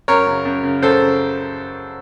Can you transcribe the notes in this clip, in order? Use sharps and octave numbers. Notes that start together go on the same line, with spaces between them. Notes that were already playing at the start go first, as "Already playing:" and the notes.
F#2 A#4 C#5
C#3
F#2
C#3
F#2 A4 C5
C#3